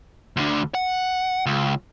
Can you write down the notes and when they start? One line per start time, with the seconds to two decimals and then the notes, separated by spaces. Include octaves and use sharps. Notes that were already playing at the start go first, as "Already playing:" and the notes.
0.37 D2 D3
0.75 F#5
1.46 C#2